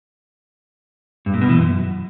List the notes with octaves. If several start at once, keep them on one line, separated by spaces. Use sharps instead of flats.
G2
A#2
B2
E3
F#2